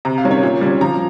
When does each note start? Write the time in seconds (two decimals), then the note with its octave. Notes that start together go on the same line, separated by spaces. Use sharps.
0.05 C3 A#5
0.18 F5
0.24 D#3 G3 C#4
0.31 C#5
0.43 A#2
0.61 G3 C#4
0.81 F3 A#5